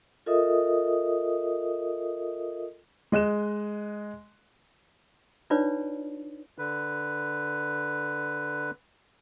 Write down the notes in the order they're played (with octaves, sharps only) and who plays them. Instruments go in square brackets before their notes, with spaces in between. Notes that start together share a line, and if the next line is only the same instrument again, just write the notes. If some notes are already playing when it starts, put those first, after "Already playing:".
[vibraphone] F4 A4 A#4 D#5 E5 D#6
[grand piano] G#3 D#5 F#6 E7
[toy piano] D4 D#4 F4 B4 C#5 D5
[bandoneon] D3 B4